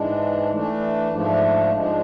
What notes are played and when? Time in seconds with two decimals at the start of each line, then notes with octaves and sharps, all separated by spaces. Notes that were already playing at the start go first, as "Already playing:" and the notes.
Already playing: G#2 E3 G#3 D4
0.51 E3 A3 D4
1.11 G#2 F3 A3 D4
1.72 G#2 F3 G#3 D4